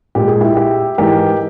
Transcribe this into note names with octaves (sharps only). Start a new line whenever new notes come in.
A#2 G#3 G4
G#4
E4 G4
E4 G4
G#2 E3 G#3 G4 A#4